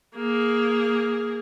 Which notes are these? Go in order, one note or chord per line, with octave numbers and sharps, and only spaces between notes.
A#3 G#4